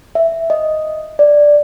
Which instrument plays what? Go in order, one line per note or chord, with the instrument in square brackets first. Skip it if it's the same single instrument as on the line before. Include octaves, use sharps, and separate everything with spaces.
[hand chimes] E5
D#5
D5